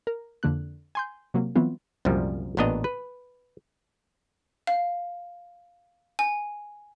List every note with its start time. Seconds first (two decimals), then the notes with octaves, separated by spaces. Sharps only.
0.07 A#4
0.43 F2 D3 A#3 F#6
0.95 G#5 C6 G6
1.34 C3 F#3 A#3
1.56 E3 F#3 G3 B3 C4 F4
2.05 C2 F#2 A#2 F3 G3
2.57 A1 A#2 B3 D4 D#5 A#5
2.84 B4
4.67 F5
6.19 G#5